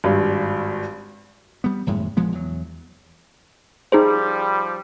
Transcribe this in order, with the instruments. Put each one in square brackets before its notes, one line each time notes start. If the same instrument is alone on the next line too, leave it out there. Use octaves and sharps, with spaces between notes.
[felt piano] G#1 G2
[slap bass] G3 B3
G#1 F#2 A2 G#3
A#1 F3 G#3 B3
E2 F#3
[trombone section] F3 G3 [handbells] D#4 G#4 C5